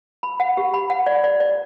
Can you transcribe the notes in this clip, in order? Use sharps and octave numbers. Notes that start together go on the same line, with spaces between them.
B5
F#5
G4
B5
F#5
D5
D5
D5